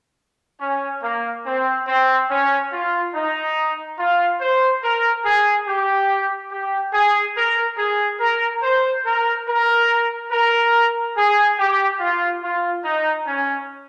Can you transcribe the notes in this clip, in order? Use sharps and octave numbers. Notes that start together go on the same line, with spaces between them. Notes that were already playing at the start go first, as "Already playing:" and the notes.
C#4
A#3
C4
C4
C#4
F4
D#4
F4
C5
A#4
G#4
G4
G4
G#4
A#4
G#4
A#4
C5
A#4
A#4
A#4
G#4
G4
F4
F4
D#4
C#4